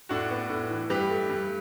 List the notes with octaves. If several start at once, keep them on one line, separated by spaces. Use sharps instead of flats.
A2 D4 F#4
B3
A2
E3
G2 G4 B4
A3
G2